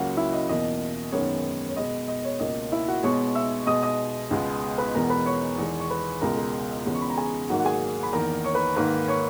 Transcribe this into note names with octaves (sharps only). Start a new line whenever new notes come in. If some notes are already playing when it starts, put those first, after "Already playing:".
Already playing: C#2 C#3 F#3 A#3 F#4 F#5
E4 E5
D#5
E2 B2 A#3 D#5
F#2 D#3 G#3 B3 C#5
C#5
B2 G#3 B3 D#5
D#5
C#5
C#2 B2 A#3 D#5
E4 E5
F#4 F#5
B2 G#3 B3 C#5 C#6
E5 E6
B2 G#3 B3 D#5 D#6
D#5 D#6
C#2 B2 G#3 B3
B4 B5
E2 B2 G#3 B3 A#4 A#5
B4 B5
C#5 C#6
E2 D#3 G#3
C#6
B4 B5
C#2 B2 G#3 A#4 A#5
A#4 A#5
E2 C#3 G#3 B3
C#6
B5
A#5
G#4 G#5
G#2 D#3 F#3 A#3 F#4 F#5
F#5
G#4 G#5
B5
E2 D#3 A#3 A#4 A#5
C#5 C#6
B4 B5
G#2 D#3 A#3 B4 B5
C#5 C#6